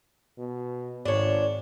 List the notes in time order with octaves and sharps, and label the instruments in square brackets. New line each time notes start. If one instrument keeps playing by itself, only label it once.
[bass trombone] B2
[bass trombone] G#1 [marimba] G#2 [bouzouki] D4 C#5